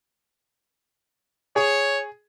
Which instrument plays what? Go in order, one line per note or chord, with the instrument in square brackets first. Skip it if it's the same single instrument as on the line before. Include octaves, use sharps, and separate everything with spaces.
[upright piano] G#4 [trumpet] C#5